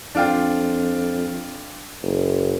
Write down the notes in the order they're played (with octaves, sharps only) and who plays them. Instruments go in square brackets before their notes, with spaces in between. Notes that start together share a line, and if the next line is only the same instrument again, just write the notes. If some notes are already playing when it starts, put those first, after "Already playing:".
[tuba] F2 [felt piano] D4 F4 G5
[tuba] F#1